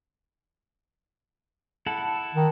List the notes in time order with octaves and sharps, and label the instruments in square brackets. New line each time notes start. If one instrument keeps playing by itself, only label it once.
[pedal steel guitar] E4 A4 F#5
[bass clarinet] D#3